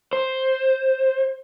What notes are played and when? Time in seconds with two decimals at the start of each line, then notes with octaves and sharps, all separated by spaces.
0.13 C5